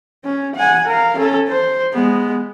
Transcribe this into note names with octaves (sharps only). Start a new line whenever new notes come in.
C#4
F#5 G#5
A#4 F5
C#4 A4
C5
G#3 B3